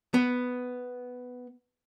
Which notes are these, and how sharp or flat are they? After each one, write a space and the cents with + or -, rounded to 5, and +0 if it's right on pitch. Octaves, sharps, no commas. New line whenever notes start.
B3 +5